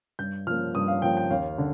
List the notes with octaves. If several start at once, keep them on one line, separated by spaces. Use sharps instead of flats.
G2 G6
F3 A#3 F6
G2 D#6
F5
F3 A#3 G5
G5
D#2 F5
D3